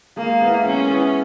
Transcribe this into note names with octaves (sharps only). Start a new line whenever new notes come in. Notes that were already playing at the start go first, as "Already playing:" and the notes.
G#3 A#3
B3 E4
G#3 C#4
B3 E4